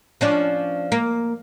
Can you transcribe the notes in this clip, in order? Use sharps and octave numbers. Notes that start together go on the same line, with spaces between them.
F3 C#4 D4
A#3